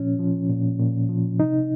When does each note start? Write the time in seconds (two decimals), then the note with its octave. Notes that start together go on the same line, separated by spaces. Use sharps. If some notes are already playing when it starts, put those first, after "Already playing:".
Already playing: A#2 F3 C#4
0.19 F3
0.49 A#2
0.79 A#2
1.09 F3
1.39 C3 D#4